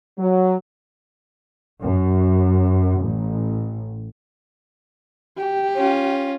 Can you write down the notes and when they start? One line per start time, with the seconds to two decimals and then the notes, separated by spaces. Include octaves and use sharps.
0.18 F#3
1.81 F#2
2.99 A1
5.38 G4
5.75 C#4 F4